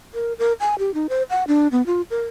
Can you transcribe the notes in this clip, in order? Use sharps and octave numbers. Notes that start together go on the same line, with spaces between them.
A#4
A#4
G#5
G4
D#4
C5
F#5
D4
B3
F4
A#4